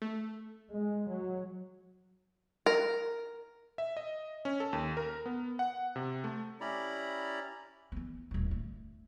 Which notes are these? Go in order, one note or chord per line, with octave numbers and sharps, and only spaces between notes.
A3
G#3
F#3
A#4
E5
D#5
C#4
A4
D#2
A#4
B3
F#5
C3
A3
C#4 E4 G4 D5 A#5 B5
E3 B3
D1 G2
D3 A3